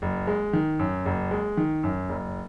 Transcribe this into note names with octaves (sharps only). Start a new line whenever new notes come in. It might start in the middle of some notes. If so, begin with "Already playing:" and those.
F#1
G#3
D#3
F#2
F#1
G#3
D#3
F#2
F#1